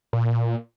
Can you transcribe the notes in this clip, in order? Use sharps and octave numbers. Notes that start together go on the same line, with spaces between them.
A#2